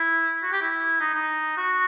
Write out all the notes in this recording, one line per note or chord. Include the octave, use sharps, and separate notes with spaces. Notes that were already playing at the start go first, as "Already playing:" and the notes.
Already playing: E4
F#4
G4
E4
D#4
D#4
F#4